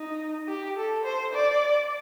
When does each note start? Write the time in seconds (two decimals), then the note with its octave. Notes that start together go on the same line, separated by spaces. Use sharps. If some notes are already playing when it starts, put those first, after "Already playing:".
Already playing: D#4
0.48 G4
0.77 A4
1.05 C5
1.33 D5